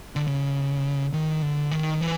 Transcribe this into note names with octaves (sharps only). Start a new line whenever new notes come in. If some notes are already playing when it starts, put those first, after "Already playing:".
D3
C#3
D#3
D3
D#3
E3